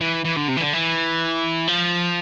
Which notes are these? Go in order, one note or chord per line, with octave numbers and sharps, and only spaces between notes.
E3
E3
D3
C3
E3
D3
E3
F3